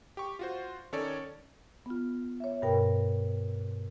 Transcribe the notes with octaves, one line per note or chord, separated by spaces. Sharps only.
G4 C#6
F4 F#4 C5
D#3 C#4 A4 C#5 D5
B3 F4
C#5 E5
G2 B2 A#4 G5